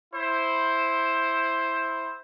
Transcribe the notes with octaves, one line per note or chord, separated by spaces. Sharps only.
E4 C5